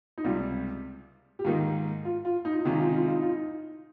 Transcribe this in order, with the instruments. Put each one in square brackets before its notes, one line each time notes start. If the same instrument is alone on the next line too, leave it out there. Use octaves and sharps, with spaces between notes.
[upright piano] D#4
[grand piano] C#2 C3 G3 [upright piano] F4
[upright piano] G4
[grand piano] G#2 D#3 A#3 D#4 [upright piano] F4
[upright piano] F4
F4
D#4
F4
D#4
[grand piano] C3 D#3 G#3 C#4 [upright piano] F4
[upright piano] D#4
F4
D#4
F4
D#4
F4
D#4
F4
D#4